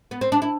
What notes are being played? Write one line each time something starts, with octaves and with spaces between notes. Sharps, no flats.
B3
C4
D4
E4